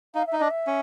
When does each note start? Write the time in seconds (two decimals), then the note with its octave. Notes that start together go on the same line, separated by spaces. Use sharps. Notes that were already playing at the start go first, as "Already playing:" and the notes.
0.15 D#4 F5
0.27 E5
0.33 D#4
0.39 D4 D#5
0.51 E5
0.67 C#4